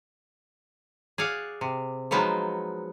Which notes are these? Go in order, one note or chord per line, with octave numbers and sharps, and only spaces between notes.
G#4 D5 F5 F#5
C3
F3 F#3 G#3 B3 D#4